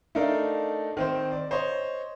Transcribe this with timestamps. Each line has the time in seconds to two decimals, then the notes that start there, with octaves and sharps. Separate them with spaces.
0.15 A3 D4 D#4 A#4 D5 F5
0.97 D#3 C4 C5
1.32 D5
1.51 C5 C#5 D#5